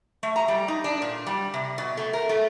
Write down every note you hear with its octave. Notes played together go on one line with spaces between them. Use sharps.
A3
A#5
G3
D#4
D4
A#2
G3
C3
B2
A3
A#4
A3